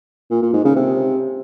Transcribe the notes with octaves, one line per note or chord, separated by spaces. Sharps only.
A#2
A#2
G#2
C#3
C3